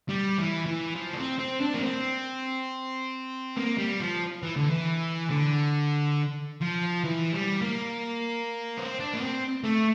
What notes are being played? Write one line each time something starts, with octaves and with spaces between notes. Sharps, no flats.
G3
E3
E3
F3
D4
C4
C4
D4
A#3
C4
A#3
G3
F3
E3
D3
E3
D3
F3
E3
G3
A#3
C4
D4
A#3
C4
A3